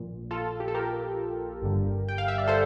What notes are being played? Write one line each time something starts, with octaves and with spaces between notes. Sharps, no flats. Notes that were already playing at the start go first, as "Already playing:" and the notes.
Already playing: A#1 A#2
F4 A4
G4
A4
G4 A#4
G1 G2 D3
G5
F5
E5
D5
A4 C5